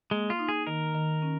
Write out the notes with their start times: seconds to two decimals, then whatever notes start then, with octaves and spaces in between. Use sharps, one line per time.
0.11 G#3 A#3
0.30 F4
0.39 D#4
0.49 G#4
0.67 D#3 A#4
0.95 D#3
1.22 C#4